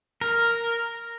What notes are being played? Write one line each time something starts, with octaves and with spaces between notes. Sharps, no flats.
A#4